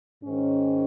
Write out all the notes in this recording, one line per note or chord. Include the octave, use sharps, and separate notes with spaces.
G#2 D#3 C#4